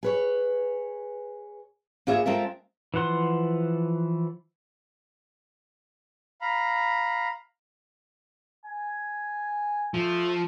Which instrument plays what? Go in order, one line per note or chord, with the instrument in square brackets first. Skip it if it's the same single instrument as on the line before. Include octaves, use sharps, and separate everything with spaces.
[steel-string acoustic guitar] G#4 B4 C#5
A#3 B3 F4 G#4 C#5 E5
G#3 C4 F4 A4 A#4 E5
[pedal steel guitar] E3 F3 F#5 C6
[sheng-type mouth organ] F5 A#5 B5
[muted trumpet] G#5
[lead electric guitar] F3 [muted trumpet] A3